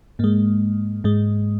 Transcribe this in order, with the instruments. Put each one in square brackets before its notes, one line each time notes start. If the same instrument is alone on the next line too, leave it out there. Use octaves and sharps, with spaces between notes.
[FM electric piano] G#2 G#3 A#3
G#2 G#3